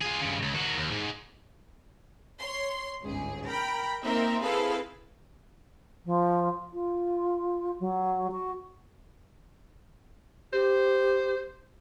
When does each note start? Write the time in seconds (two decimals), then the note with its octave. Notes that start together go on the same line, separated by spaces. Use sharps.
0.01 F4 G#4
0.21 G2 C#3
0.43 C#2
0.55 D#3 F#4
0.76 D#2
0.91 G#2
2.40 C#5 C6
3.03 G1 C#2 G#2 G#4
3.46 A#4 G5 A#5 B5
4.03 A#3 C4 D#4 A#4 E5
4.42 C4 E4 G#4 A4 B4 F5
6.05 F3
6.72 F4
7.79 F#3
8.31 F#4
10.53 G4 C5